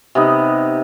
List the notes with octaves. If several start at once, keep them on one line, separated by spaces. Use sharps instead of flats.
C3 B3 D#4